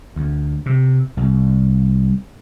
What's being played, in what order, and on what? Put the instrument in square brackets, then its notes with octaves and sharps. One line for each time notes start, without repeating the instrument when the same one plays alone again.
[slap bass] D2
C3
C2